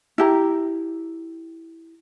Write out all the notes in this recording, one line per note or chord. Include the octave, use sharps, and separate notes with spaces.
E4 G4 A#5